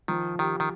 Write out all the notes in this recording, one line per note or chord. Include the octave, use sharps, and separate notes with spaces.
D#3 F3
D#3 G4
D#3